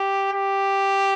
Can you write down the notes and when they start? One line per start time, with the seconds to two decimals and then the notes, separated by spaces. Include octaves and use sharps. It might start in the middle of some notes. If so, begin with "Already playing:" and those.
Already playing: G4
0.33 G4